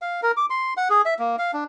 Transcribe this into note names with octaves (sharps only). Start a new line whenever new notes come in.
F5
A#4
D6
C6
F#5
G#4
E5
A#3
F5
D4